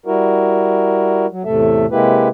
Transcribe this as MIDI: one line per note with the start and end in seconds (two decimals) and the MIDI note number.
0.06 1.26 55
0.06 1.26 64
0.06 1.26 66
0.06 1.26 70
1.31 1.43 54
1.45 1.86 40
1.45 1.86 45
1.45 1.86 48
1.45 1.86 57
1.45 1.86 69
1.45 1.86 76
1.91 2.28 48
1.91 2.28 56
1.91 2.28 58
1.91 2.28 64
1.91 2.28 67
1.91 2.28 71